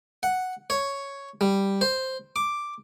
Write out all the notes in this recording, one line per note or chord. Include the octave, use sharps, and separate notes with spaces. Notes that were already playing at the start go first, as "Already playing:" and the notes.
F#5
C#5
G3
C5
D6